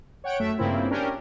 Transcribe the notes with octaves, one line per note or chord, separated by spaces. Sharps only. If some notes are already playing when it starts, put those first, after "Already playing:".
C#5 F#5 G5 D7
F#2 A3 E5
G2 C#3 A#3 C4 E4 F4
C#4 D4 G4 A#4